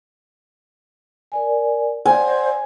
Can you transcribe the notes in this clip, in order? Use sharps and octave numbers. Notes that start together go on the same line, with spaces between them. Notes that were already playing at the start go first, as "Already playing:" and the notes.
A#4 D5 G#5
C5 D5 F#5 G#5